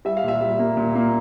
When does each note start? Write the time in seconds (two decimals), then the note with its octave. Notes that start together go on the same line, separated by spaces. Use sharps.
0.05 G3 E5
0.17 F5
0.24 A#2 E5
0.41 G3
0.59 A#3
0.77 A#2
0.95 A#3